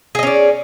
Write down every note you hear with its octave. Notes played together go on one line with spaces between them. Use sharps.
C#4 G#4 D5 D#5